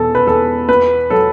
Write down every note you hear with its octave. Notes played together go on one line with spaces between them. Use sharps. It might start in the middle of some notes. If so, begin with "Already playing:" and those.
Already playing: E2 B2 A4
B4
E2 A4
B3 B4
F#3 A4